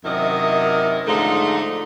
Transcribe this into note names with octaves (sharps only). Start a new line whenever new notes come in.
F#2 C3 D#3 E4 D#5
G#2 D3 F3 A3 D#4